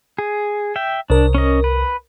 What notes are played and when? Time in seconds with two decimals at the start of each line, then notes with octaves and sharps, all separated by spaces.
0.19 G#4
0.76 E5 G5
1.10 C2 D4 A#4
1.35 C#4 D#5
1.64 B4